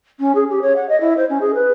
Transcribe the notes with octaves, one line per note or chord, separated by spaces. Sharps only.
C#4
G#4
G4
C#5
F#5
D#5
E4
C5
C#4
G#4
B4